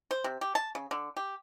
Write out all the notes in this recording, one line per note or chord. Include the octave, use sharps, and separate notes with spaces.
C5
C3
G4
A5
C#3
D3
G4